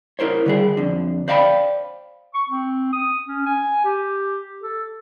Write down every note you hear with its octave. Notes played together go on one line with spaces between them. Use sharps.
E4 A#4 C5 C#5
D3 G3 G#4
F2 D3
C5 D5 F5 G5 A5 B5
C#6
C4
D#6
C#4
G#5
G4
A4